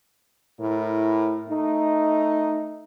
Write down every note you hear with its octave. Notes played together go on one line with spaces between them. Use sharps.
A2 E4 A#4
A3 D#4